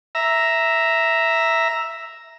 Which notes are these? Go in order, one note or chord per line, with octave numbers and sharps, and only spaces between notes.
E5 A#5